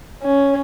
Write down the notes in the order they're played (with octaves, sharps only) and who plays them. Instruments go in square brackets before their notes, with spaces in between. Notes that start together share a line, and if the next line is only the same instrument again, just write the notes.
[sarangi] C#4